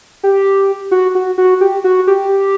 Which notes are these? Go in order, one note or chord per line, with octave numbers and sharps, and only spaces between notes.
G4
F#4
F#4
F#4
G4
F#4
G4